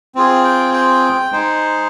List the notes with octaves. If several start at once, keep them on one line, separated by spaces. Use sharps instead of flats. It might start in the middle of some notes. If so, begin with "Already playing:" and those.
C4 F4 G#4
G5
G5
G#3 D#4 G#4 C5